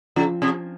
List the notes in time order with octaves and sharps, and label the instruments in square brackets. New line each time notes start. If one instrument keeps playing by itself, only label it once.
[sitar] C#3 [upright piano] F3
[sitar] C3